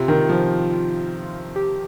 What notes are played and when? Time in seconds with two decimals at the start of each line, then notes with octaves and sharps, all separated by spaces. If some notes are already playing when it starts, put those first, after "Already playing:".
Already playing: C3 F4
0.08 D#3
0.29 F3
1.56 G4